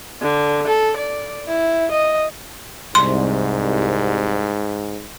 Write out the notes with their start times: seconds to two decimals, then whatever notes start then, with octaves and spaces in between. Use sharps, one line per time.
0.22 D3
0.67 A4
0.97 D5
1.48 E4
1.91 D#5
2.95 C2 G#2 C6